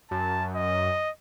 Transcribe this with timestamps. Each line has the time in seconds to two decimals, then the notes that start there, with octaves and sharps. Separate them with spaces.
0.11 F#2 A5
0.54 D#5